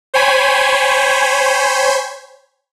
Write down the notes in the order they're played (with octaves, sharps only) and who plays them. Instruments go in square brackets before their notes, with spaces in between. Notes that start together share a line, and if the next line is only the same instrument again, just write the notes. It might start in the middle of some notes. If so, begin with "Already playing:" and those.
[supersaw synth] C5 C#5 G5 G#5 B5